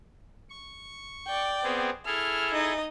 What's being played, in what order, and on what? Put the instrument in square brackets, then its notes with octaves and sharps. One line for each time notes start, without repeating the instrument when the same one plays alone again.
[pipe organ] C#6
[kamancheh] D5 G5
[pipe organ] B3 C4 G#4
[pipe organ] E4 G#4 A4 [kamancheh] F6
[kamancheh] D#4 D#5